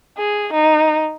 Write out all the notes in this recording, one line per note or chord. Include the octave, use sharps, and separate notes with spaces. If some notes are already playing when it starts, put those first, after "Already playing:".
G#4
D#4